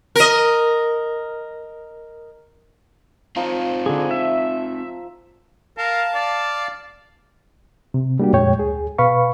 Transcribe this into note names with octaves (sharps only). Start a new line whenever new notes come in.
A#4 D#5
F3 A#3 C4 D#4 D#6
D3 G#4
E5
A#4 F5 A5
D5
C3
G3 A#3 D4 F#4 G4
F2 A#2 G#3 C#5 G5
D2 G#4
B2 B4 F5 B5 C#6